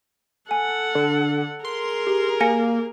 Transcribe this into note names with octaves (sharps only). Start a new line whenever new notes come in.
A4 F#5 G#5
D3
G#4 A#4 C6
G4
A#3 G#5 A#6 C#7